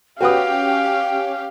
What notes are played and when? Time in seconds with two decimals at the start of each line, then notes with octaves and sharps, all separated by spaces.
0.21 C#4 F#4 G4 B4 F5 G5 D#6